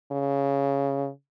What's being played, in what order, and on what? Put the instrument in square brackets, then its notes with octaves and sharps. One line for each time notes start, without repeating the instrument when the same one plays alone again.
[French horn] C#3